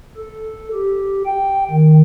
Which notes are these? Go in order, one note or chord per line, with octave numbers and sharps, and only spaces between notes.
A4
G4
G5
D#3